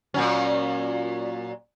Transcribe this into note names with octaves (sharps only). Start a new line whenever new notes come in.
A#2 F#3 C#4